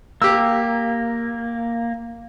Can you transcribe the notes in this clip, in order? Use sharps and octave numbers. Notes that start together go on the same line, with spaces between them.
A#3 G4 E6